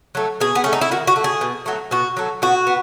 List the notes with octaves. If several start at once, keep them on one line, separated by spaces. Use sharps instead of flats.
F#3 A3
B2 G#4
B3
A3 C#4
D#4
E4
D#3 F#4
F#4
A3
G#4
B2
F#3 A3
B2 F#4
F#3 A3
B2 F#4
B3